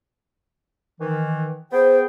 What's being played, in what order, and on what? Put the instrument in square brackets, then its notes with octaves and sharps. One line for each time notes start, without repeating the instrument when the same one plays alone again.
[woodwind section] D#3 E3
[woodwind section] B3 G#4 G5 [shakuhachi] C5